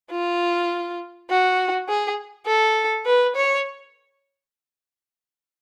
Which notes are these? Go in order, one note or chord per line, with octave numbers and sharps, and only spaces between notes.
F4
F#4
G#4
A4
B4
C#5